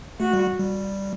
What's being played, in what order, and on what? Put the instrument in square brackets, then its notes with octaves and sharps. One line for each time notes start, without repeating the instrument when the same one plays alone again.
[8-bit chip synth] A3 [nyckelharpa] F#4
[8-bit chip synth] G3
G3